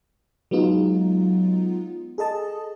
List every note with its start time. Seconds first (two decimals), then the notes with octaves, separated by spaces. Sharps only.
0.51 F#3 G#3 B3 D#4 F4
2.18 G#4 A4 D#5 A5